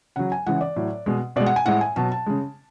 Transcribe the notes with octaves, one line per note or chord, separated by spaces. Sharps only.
C#3 F#3 F#5
G#5
C#3 E3 G#3 F#5
D5
A2 F#3
B2 G#3
B2 G#3 D5
F#5
G#5
A2 G#3 F#5
G#5
B2 F#3 A5
A5
C#3 G#3